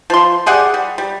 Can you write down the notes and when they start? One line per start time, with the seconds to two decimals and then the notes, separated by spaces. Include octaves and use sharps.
0.10 F3 C6
0.46 G4 G#4 D5 F#5
0.74 G3
0.98 G3